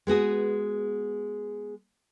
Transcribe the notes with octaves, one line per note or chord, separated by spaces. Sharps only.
G#3 B3 F#4 G#4